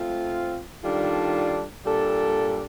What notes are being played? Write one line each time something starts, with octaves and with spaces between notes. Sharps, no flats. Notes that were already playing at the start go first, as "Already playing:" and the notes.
Already playing: A3 C4 F4
D#3 G3 D4 F4 A4
A#2 G3 D4 A4